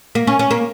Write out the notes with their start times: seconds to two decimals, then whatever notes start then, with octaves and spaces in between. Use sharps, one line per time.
0.15 A#3
0.27 C#4
0.39 C#4
0.51 A#3